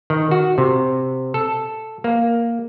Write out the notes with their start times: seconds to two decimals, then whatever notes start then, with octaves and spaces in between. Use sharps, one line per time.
0.10 D#3
0.31 F#4
0.58 C3
1.34 A4
2.04 A#3